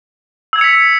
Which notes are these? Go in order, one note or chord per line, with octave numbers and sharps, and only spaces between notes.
E6 G#6 B6 C#7 F7